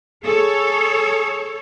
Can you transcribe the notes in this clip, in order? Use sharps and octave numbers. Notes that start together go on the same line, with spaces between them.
G#4 A4 C#5